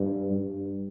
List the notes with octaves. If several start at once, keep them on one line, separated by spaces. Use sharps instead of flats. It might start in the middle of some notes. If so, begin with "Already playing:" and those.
Already playing: G2
G2